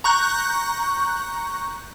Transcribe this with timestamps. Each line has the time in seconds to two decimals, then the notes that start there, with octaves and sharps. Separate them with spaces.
0.04 A#5 C#6 F#6 G6